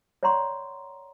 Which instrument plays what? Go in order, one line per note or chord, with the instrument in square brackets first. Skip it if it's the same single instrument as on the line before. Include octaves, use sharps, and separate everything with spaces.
[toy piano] C#5 D5 F#5 A#5 C6 C#6